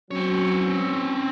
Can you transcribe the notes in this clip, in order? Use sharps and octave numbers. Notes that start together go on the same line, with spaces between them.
F#3 C4 C#4 C#5